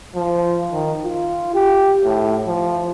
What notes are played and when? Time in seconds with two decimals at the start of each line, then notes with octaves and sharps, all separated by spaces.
0.15 F3
0.72 D#3
1.04 F4
1.54 G4
2.04 A2
2.47 F3